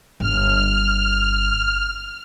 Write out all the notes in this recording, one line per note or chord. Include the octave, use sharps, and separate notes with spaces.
G1 F6